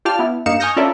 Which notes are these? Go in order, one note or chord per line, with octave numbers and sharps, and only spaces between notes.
F4 G4 D5 G5 A5 F6
B3 E4
G2 A#3 D#4 F5 C#7 E7
G#5 C#6 D#6 F6 G6 A#6
C#4 F4 A4 A#4 D5 E5